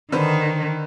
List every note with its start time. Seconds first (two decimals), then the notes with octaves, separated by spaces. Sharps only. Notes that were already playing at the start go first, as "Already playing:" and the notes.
0.12 D3 D#3 B4 C5